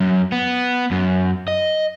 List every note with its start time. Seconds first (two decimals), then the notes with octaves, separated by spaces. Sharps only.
0.01 F#2
0.32 B3
0.91 F#2
1.48 D#5